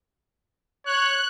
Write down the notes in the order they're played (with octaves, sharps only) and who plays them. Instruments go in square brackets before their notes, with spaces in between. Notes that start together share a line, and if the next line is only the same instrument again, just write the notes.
[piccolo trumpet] C#5 [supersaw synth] F#6